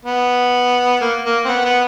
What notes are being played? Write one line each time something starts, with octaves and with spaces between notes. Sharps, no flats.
B3
A#3
A#3
C4
B3
B3